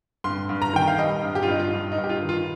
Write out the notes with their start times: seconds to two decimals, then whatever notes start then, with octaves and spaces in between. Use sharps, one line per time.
0.24 G2 C6
0.49 G2
0.62 A#5
0.73 D#3 G5
0.88 F5
0.98 G3 D#5
1.23 G2
1.35 G4
1.43 F4
1.48 G2 D#4
1.59 F4
1.73 G2
1.92 D#4
1.98 G2
2.04 G4
2.09 F4
2.22 D#3
2.29 F4